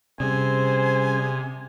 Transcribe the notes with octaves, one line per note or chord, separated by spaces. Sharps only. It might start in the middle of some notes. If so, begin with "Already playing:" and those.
C3 G3 C#4 G#4 C5 G#5